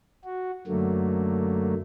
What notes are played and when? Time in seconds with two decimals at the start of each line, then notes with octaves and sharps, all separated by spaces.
0.25 F#4
0.67 F#2 D3 F#3 A3 A#3